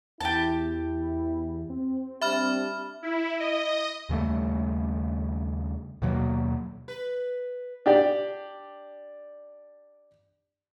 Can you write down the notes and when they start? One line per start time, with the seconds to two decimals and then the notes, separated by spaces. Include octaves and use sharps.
0.21 E2 E4 G4 A5
1.70 C4
2.21 G3 D4 G4 E5 B5 F6
3.03 E4
3.40 D#5
4.09 D#2 C#3 G3 A3
6.02 D#2 B2 F#3 A#3
6.88 B4
7.86 D4 G4 D5